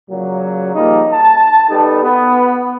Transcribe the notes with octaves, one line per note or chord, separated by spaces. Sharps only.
A#2 C#3 F#3
C#3 F3 G3 A#3 D#4
A5
G3 B3 D#4 G4 A4
B3